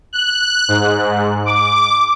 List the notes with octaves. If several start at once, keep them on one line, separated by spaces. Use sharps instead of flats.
F#6
G#2
D6